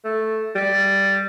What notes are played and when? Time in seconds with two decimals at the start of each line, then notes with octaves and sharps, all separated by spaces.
0.05 A3
0.55 G3